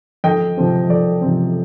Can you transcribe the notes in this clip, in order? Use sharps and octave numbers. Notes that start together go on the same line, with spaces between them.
F2 D#5 G5
C3 F3 C4
F2 D5
C3 F3 C4